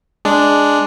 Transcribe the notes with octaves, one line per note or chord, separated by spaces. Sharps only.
G#3 D4